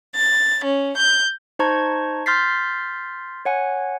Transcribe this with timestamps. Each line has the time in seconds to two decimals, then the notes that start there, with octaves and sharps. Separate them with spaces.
0.15 A6
0.64 C#4
0.97 G6
1.59 D#4 C5 A5 A#5 C#6 G#6
2.26 C6 F6 G6 A6 B6 C7
3.45 C#5 F#5 G#5